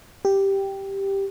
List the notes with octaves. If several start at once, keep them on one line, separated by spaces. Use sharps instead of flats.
G4